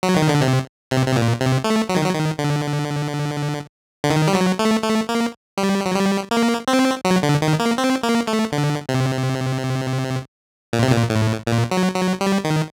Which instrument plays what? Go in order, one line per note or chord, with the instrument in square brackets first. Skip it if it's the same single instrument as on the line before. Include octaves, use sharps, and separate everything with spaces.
[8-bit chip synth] F#3
D#3
D3
C3
C3
C3
A#2
C3
A3
F#3
D#3
F#3
D#3
D3
D3
D#3
G3
F#3
A3
A3
A#3
G3
F#3
G3
A#3
C4
F#3
D3
D#3
A#3
C4
A#3
A3
D3
C3
A#2
C3
A#2
A2
A#2
F#3
F#3
G3
D#3